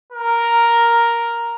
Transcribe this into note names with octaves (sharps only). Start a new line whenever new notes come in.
A#4